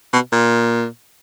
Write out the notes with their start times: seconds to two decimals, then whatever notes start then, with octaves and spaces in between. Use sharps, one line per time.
0.13 B2
0.32 A#2